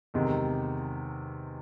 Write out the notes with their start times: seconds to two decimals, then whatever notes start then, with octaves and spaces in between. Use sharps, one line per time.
0.14 E2 C3 D#3 G#3